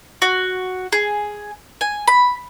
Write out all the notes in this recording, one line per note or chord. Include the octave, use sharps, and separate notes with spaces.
F#4
G#4
G#5
B5